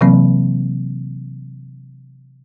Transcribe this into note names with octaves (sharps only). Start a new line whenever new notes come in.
C3 E3 F#3 A#3 C4